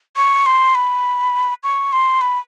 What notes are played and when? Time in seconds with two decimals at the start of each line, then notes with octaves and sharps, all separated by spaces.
0.16 C#6
0.46 C6
0.75 B5
1.63 C#6
1.92 C6
2.21 B5